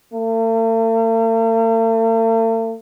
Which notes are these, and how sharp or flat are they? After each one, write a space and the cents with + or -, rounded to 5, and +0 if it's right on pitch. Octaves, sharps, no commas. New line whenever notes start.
A3 +45